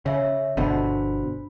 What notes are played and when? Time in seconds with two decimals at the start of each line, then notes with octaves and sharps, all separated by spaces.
0.06 C#3 C#5 E5
0.57 G1 B2 D3 D4 C5 B5